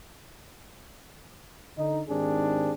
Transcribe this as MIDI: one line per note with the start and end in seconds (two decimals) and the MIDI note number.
1.77 2.02 50
1.77 2.02 63
2.09 2.72 44
2.09 2.72 51
2.09 2.72 60
2.09 2.72 62
2.09 2.72 67
2.09 2.72 68